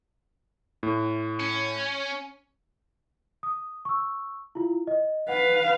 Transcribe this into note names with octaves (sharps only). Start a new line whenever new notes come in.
A2
C#4
D#6
C#6 E6
E4 F4
D#5
B4 F5 F#5